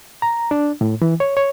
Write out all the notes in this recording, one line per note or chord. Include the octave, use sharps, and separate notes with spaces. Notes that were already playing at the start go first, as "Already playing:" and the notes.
A#5
D4
A2
E3
C#5
C#5